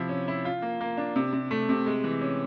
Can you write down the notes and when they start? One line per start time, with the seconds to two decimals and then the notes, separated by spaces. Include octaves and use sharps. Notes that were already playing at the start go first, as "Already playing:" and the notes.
Already playing: C3 F3 E4
0.09 C#4
0.28 E4
0.45 F4
0.62 A#3
0.81 A#3
0.97 D4
1.16 C3
1.33 C3
1.51 A3
1.69 C3
1.86 G#3
2.04 E3
2.21 C#4